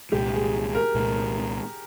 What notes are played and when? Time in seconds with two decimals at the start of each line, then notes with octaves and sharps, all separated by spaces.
0.12 C2 A#2 G#3 G4
0.33 G#4
0.75 A#4
0.94 C2 A#2 G#3